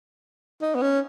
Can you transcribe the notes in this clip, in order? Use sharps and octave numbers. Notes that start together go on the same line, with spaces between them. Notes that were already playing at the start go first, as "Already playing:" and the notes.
D#4
B3
C#4